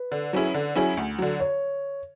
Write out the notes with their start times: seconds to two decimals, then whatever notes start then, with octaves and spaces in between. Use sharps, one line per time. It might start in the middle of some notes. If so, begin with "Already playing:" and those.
Already playing: B4
0.12 D3
0.33 F#3 C#4 E4 G#4
0.54 D3
0.75 F#3 C#4 E4 G#4
0.97 D2
1.18 D3 F#3
1.40 C#5